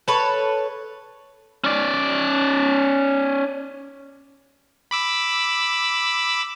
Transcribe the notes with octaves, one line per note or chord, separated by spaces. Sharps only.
A4 B4 C#5
C#4 D5
B5 D6 E6